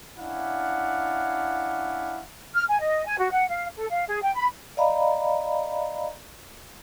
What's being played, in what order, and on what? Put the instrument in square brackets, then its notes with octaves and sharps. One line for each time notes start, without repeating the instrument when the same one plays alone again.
[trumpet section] C#4 D4 E4 F5 F#5
[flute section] F6
G#5
D#5
G#5
F#4
F#5
F5
A4
F5
G#4
G5
B5
[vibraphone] D5 D#5 F5 A#5 B5